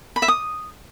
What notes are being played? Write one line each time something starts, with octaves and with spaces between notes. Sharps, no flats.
B5
E5
D#6